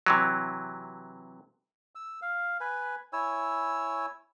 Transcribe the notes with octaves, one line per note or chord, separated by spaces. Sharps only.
C3 E3 F#3
E6
F5
B4 G#5
E4 C#5 G#5 E6